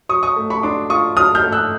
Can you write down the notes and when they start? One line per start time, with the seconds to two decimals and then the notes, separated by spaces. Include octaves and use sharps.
0.09 F#3 C#6 D#6
0.23 C#6 D#6
0.36 A3
0.50 B5 C#6
0.63 D4 C6 D6
0.90 F4 C#6 D#6
1.16 F#3 D#6 F6
1.35 F6 G6
1.44 A3
1.52 E6 F#6